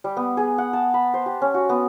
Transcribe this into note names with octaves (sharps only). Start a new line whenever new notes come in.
G3
B3
G#4
F#5
A5
B5
C5
G4
C#4
F#4
B3